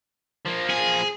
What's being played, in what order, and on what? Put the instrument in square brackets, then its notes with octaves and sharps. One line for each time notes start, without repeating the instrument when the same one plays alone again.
[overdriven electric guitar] F3 A#3
[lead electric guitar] G#4